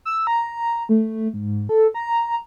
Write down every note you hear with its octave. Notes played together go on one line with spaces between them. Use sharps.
E6
A#5
A3
G#2
A4
A#5